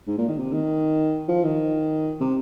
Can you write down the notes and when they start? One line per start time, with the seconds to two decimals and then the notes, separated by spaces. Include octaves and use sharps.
0.07 G#2
0.18 A#2
0.28 D#3
0.38 C3
0.53 D#3
1.29 F3
1.44 D#3
2.20 C3